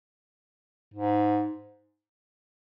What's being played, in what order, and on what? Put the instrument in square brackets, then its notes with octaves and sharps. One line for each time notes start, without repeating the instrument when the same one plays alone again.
[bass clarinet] G#2